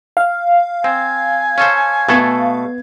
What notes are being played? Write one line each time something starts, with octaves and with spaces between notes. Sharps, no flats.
F5
C4 G#5
C#4 A4 C5
B2 A3 B3 A4 G#6